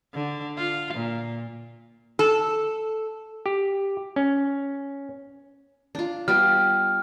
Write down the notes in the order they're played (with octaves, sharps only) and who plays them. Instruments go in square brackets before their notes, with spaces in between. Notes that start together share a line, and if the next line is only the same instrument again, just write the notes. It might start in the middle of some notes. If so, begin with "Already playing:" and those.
[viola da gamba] D3
F4
A#2
[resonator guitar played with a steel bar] A4
[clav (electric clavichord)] G4
C#4
[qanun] D4 F4
[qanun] G3 B3 F4 [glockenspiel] F6